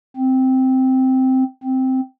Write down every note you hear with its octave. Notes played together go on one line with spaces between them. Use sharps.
C4
C4